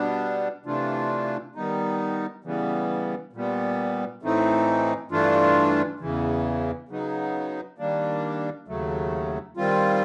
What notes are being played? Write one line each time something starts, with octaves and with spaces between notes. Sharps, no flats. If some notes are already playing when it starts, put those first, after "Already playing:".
Already playing: B2 G3 B3 D4
C3 E3 A3 D4 F4
D#3 G3 B3 D#4
C#3 E3 G3 B3
A#2 G3 B3
A2 E3 A3 C4 D#4
G2 E3 A3 D4 F4
E2 C#3 E3
C#3 F#3 B3 D#4
D#3 G3 A#3 D4
D#2 C#3 F#3 A3
D#3 G3 C4 F4